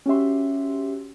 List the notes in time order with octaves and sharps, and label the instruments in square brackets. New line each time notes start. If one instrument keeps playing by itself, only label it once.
[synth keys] C#4 F#4 G4 E5 C6